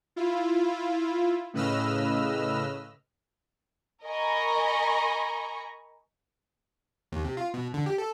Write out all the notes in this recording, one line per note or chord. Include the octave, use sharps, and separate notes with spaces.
E4 F4
A2 C#3 B4 D#5 E6 F6
A#4 D#5 G#5 A#5 B5 C#6
D#2
C3
F4
B2
D3
G4
A4